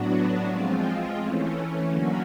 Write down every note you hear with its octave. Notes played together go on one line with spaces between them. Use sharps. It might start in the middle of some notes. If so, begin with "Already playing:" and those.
Already playing: A2 F#3 B3 D4 F#4
F3 G#3 C4 F4
E3 A3 C#4
D3 F#3 A#3 C#4 F#4